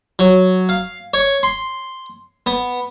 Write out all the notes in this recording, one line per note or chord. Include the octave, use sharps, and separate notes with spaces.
F#3
F5
C#5
C6
B3